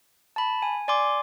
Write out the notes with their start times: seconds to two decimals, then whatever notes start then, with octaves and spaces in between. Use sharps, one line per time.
0.36 A5 B5
0.62 G#5
0.88 D5 G#5 C6 D6